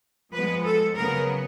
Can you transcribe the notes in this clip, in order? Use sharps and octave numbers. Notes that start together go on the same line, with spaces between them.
F3 G#3 B3 B4
A4
C#3 F#3 B3 A#4